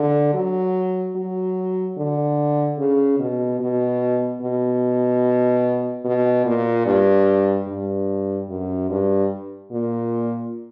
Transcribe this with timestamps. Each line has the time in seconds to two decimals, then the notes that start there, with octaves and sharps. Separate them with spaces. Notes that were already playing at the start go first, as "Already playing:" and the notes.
Already playing: D3
0.34 F#3
1.16 F#3
1.97 D3
2.78 C#3
3.19 B2
3.60 B2
4.41 B2
6.05 B2
6.45 A#2
6.86 G2
7.68 G2
8.49 F#2
8.90 G2
9.72 A#2